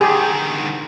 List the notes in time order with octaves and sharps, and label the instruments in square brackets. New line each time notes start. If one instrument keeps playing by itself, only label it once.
[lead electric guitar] D3 D#3 [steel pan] G4 G#4